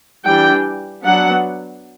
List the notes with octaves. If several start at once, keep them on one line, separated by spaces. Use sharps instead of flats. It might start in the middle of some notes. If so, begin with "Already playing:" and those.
E3 G3 D4 G5
F#3 B3 D4 F#5